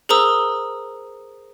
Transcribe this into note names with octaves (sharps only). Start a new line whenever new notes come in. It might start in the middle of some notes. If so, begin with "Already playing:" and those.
G#4 A#4 C5 A#5 D#6 E6